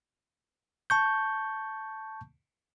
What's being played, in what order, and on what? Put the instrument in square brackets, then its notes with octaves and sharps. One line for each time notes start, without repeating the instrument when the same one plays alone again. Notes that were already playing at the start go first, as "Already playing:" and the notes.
[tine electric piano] A5 C#6 G6